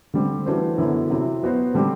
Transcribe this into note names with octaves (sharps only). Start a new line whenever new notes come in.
D3 G3 C4
E3 A3 D4 F#4 C5
F#2 D3 F#3 B3 E4
C3 F#3 C4 E4
F#3 B3 F#4 C5
D3 G3 C4 G4